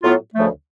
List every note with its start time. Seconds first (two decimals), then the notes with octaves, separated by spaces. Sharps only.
0.02 A2 F#3 B3 F4
0.35 D2 C#3 F3 A3